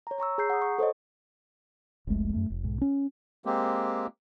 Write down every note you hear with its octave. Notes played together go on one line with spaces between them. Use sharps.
C#5 A#5
C#5 A#5 C#6 E6
G#4 A#5 G6 C7
F#5 D#6
C#6
A4 C5 C#5 D#5
F1 C2 G#3 A3
F#2 A3
F1
B1 G#2
C#4
G#3 A#3 C4 G4